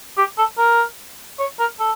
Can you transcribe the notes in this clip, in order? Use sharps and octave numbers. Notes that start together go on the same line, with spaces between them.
G4
A4
A#4
C#5
A#4
A4